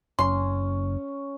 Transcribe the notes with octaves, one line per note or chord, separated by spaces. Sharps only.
F#1 C#4 C6